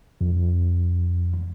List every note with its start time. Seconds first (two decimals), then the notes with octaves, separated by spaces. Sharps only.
0.21 F2